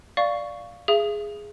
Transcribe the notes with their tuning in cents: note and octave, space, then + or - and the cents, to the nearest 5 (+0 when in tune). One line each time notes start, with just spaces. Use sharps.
D5 +0 F5 +0 C#6 +5
G#4 +0 E5 +45 D#6 +0